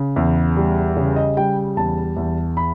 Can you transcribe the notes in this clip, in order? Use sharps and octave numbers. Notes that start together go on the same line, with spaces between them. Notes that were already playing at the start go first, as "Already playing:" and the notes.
Already playing: C#3
E2
G3
C#3
D#5
G3 G5
E2 A5
E2
B5